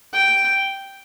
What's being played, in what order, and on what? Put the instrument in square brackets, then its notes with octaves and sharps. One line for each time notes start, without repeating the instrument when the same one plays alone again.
[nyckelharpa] G5